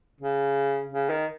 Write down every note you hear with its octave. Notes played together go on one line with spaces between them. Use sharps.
C#3
C#3
D#3